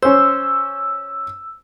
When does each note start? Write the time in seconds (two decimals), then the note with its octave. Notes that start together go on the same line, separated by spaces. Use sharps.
0.02 C#4 C5 E6